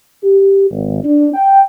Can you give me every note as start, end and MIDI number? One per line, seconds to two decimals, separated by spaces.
0.23 0.69 67
0.70 1.01 32
1.02 1.32 62
1.35 1.61 79